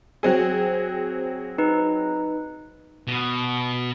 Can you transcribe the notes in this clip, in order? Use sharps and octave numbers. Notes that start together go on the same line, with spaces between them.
F#3 C4 G#4
D#4 B4
B2